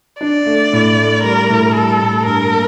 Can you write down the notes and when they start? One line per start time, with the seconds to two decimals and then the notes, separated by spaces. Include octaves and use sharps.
0.21 D4 D5
0.46 A3
0.73 A2
0.98 A3
1.23 G3 A#4
1.50 A2
1.74 G3 A4
2.01 A2
2.26 G2 A#4
2.51 A#3